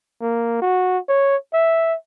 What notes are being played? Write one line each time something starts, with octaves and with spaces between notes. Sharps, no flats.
A#3
F#4
C#5
E5